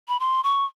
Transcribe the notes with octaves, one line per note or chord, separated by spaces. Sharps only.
B5
C6
C#6